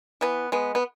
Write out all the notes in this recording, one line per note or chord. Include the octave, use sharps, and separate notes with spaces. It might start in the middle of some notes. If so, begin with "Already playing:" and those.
E3 B3
G#3 B3
B3